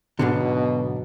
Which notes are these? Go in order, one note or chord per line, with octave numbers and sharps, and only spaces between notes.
B1 G#2 B2 D3